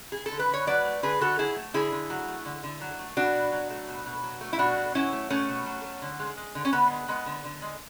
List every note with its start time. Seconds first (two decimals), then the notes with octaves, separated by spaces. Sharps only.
0.12 G#4
0.26 A4
0.32 D3
0.39 B4
0.49 D3 C#5
0.67 F#3 B4 D5
0.85 A3
1.03 D3 G#4 B4
1.21 D3 F#4 A4
1.38 F#3 E4 G#4
1.56 A3
1.74 D3 E4 G#4
1.92 D3
2.10 F#3
2.28 A3
2.45 D3
2.63 D3
2.81 F#3
2.99 A3
3.17 B2 D4 F#4
3.34 B2
3.52 F#3
3.70 A3
3.88 B2
4.06 B2
4.23 F#3
4.41 A3
4.53 E4
4.59 B2 D4 F#4
4.77 B2
4.95 F#3 C#4 E4
5.13 A3
5.30 B2 A3 C#4
5.49 B2
5.66 F#3
5.84 A3
6.02 D3
6.20 G#3
6.37 G#3
6.55 D3
6.65 C#4
6.73 D3 B3
6.91 G#3
7.08 G#3 B3
7.26 D3
7.44 D3
7.62 G#3